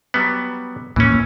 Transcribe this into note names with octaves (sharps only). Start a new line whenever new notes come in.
F#3 G3 B3
D#2 A2 E3 A#3 C#4